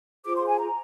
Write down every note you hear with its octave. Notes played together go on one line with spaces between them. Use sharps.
F4 G#4 C5 D6
C6
G#5
A#5